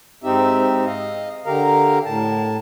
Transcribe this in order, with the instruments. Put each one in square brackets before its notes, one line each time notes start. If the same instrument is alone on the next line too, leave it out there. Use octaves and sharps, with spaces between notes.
[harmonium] G#2 C4 D#4 G4 E5
D#5 F5
D3 G4 A#4 F5 A#5
A2 A5